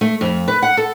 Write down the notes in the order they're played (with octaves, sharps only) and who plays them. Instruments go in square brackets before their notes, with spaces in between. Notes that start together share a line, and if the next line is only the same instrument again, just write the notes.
[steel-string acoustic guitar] A3
F2
B4
F#5
A4